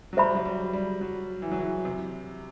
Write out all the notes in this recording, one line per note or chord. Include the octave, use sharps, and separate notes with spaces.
F#3
G3 C5 E5 B5
F#3
G3
G3
F#3
E3
F#3
E3
C3